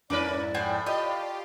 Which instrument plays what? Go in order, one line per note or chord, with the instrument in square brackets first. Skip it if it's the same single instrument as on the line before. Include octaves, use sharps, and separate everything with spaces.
[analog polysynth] F2 G#2 E4 [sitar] C#4 A#4 B4 [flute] D5 [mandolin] D6
[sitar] A2 [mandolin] C4 F#5 G#5
[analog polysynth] F4 G4 [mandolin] D#5 G5